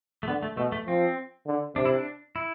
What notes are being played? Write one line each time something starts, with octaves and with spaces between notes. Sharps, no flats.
A3
D3 B3
A3
B2 A3
A3
F3 C4
D3
C3 D4
E4
D4
E4